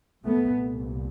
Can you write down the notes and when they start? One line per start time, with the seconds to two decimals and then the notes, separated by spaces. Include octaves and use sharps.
0.24 C2 A#2 A3 B3